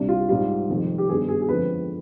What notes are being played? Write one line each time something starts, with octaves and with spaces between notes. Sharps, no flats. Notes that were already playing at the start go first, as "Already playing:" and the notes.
Already playing: C2 C3 G3 D4
F4
G#2 G3 C4 F4
F1 F2 D#3
G4
G2 D#3 B3 D#4 G#4
G#4
G#4
F2 D3 F3 G#3 C4 B4